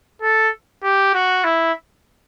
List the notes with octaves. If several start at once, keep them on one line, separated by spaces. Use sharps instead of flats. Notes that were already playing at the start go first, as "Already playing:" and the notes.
A4
G4
F#4
E4